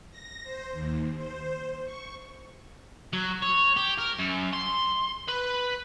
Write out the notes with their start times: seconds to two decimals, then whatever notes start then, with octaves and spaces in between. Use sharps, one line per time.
0.10 A#6
0.44 C5
0.73 D#2
1.17 C5
1.84 C#6
3.13 F#3
3.42 C#5
3.77 G4
3.98 A#4
4.19 F#2
4.53 C6
5.28 B4